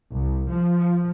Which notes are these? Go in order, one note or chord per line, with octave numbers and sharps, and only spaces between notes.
C2
F3